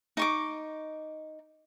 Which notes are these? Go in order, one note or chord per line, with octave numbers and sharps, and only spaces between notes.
D#4 C#6 D6